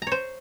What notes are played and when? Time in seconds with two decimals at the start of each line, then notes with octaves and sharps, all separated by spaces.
0.02 A#5
0.07 C#5
0.12 C5